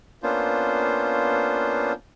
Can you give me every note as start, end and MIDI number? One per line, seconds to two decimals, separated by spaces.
0.23 1.93 58
0.23 1.93 59
0.23 1.93 61
0.23 1.93 62
0.23 1.93 65
0.23 1.93 72